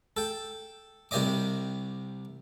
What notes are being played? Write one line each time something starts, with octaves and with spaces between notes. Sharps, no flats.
A4 G5
C2 C3 G4 D5 D#5 D6